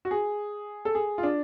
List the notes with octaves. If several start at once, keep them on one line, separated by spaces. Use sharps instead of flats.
F#4
G#4
A4
G#4
F4
D4